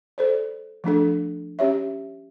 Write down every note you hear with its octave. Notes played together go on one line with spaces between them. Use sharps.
A4 C5 D5
F3 A3 D4 A4
C#4 G4 C#5 E5